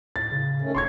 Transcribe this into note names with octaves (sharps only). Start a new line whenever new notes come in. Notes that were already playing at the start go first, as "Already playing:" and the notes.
A2 A6
C#3
D#3 A3 C#4
F1 C#5 C6 C#6 G#6